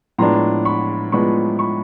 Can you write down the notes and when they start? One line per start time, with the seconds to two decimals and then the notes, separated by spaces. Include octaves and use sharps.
0.18 A2 F3 G#3 B3 D4 A#5 C6
0.65 B5 C#6
1.12 A2 F3 G#3 B3 D4 B5 C#6
1.59 B5 C#6